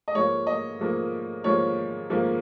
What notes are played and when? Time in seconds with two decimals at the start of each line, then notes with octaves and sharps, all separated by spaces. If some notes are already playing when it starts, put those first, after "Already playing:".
0.08 D#5
0.14 G#2 F3 A#3 C#5
0.47 D#5
0.79 G#2 F3 A#3
1.44 G#2 F3 A#3 C#5
2.10 G#2 F3 A#3